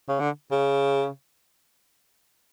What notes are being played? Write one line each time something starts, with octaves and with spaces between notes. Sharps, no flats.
C#3
D3
C#3